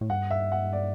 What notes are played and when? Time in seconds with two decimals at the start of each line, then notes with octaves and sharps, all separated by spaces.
0.01 A2
0.10 G2 F#5
0.30 E5
0.52 F#5
0.73 D5